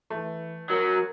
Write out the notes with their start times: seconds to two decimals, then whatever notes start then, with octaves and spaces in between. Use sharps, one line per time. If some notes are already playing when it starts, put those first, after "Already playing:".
0.10 E3 A3
0.70 F#3 C#4 A#4